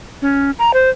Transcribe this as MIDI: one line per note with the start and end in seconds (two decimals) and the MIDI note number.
0.22 0.51 61
0.59 0.71 82
0.74 0.90 72